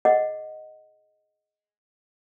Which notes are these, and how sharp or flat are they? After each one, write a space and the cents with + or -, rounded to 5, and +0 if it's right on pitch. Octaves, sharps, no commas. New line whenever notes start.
G#4 +15 D#5 +0 F#5 +0